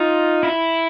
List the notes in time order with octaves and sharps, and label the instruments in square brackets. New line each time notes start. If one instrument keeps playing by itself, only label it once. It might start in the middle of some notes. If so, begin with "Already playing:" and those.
Already playing: [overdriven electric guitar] D#4 [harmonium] F4
[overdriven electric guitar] E4